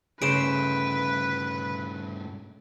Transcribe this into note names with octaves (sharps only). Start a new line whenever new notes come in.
G2 C#3 A3 B4 C5 D7 E7